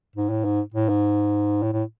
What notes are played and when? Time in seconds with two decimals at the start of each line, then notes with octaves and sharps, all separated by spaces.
0.16 G#2
0.30 A2
0.45 G#2
0.74 A2
0.89 G#2
1.63 A2
1.73 A2